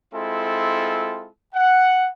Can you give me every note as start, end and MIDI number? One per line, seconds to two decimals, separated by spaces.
0.14 1.29 56
0.14 1.29 60
0.14 1.29 64
0.14 1.29 65
0.14 1.29 69
1.55 2.08 78